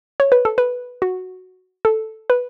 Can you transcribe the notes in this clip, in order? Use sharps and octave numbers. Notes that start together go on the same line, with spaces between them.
C#5
B4
A4
B4
F#4
A4
B4